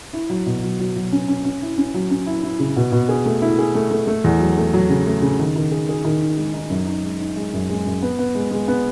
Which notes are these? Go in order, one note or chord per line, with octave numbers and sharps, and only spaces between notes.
E4
F#3
B2
F#3
F#3
F#3
C#4
C#4
C#4
E4
C#4
F#3
C#4
E4
E4
C#3
B2
B2
G#4
A3
E4
G#4
A3
A3
A3
E2
F#3
A3
F#3
C#3
A3
C#3
D#3
D#3
G#4
G#4
D#3
D#4
G#3
D#4
F#2
D#4
G#3
D#4
G#3
F#2
G#3
F#2
B3
B3
G#3
G#3
B3